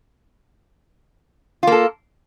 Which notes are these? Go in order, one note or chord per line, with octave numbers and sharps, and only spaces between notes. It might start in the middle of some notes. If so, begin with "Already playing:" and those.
A#3 F4 A4